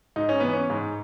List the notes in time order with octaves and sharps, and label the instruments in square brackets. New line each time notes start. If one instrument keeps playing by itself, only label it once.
[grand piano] G#2 D#4
C#4
E3 B3
C#4
G#2